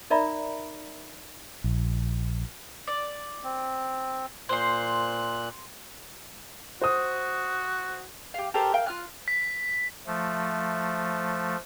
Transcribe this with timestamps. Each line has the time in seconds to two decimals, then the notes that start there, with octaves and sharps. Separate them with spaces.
0.10 D#4 A#4 D5 E5 A#5 B5
1.64 A#1
2.87 D5
3.44 C4
4.49 A#2 C5 C6 F#6
6.81 F#4 C5 D#6
8.34 G4 F5
8.54 G4 A4 A#4 C5
8.74 A#4 F5 G5
8.86 F4 F6 F#6
9.28 B6
10.06 F3 A3